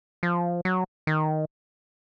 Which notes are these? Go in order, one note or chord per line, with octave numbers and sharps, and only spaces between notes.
F3
F#3
D#3